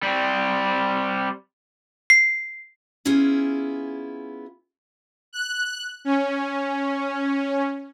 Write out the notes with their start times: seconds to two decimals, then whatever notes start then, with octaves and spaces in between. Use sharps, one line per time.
0.03 G3 C4
2.10 C7
3.05 B3 C#4 E4 F4 G#4
5.33 F#6
6.05 C#4